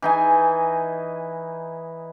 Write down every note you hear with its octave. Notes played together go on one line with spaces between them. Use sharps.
E3 D#4 G#5